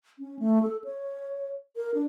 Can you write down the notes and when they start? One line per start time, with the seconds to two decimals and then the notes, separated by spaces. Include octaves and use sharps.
0.19 C#4
0.39 A3
0.63 A4
0.84 C#5
1.76 A#4
1.94 D4